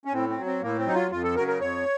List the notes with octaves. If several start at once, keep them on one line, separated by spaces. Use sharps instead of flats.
C#4
A2 C4
C4
F#3
C4
A2 A#3
C4
F#3 D#4
F4
F2 F4
A4
C#3 F#3 A#4
A#4
F2 C#5